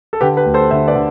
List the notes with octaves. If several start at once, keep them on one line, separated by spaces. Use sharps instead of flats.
A4
D3 G4 B4
G4 B4
D2
A4 C5
D3 C5 E5
B4 D5
D3